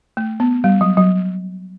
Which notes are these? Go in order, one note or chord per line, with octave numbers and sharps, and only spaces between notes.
A3
B3
G3
F#3
F#3